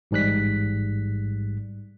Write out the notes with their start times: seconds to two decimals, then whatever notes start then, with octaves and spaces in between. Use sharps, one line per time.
0.11 A1 G#2 G3 F#6 B6